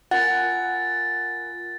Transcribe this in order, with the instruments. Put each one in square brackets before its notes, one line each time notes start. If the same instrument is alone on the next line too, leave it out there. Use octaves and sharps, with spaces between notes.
[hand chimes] F4 A#4 G#5 [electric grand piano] F#5 [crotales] A6